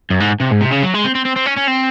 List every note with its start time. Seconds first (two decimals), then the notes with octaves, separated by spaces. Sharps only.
0.11 F#2
0.21 G#2
0.41 C3
0.52 G#2
0.63 C3
0.72 C#3
0.83 F#3
0.94 G#3
1.04 C4
1.15 C4
1.25 C4
1.36 C4
1.46 C#4
1.56 C#4
1.67 C4